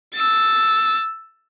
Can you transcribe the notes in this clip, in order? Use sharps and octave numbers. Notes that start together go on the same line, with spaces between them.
E6 A6